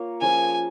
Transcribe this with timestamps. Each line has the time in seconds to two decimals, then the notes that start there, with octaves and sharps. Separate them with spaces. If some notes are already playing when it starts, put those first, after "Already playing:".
Already playing: A#3 F4 C#5
0.21 F3 C#4 G#4 G#5